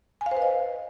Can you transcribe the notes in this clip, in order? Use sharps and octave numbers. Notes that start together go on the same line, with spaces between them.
G#5
F5
C5
B4
D#5